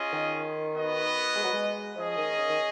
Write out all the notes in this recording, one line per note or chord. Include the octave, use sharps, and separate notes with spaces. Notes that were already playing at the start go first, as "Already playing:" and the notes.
Already playing: C#4 F4 G#4 D#5
D#3
B3 F#4 B4 D#5
G#3
F#3
G#3
F3 C#4 G#4 D#5
D#3
C#3
D#3